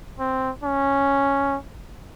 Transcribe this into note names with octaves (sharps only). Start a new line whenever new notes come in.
C4
C#4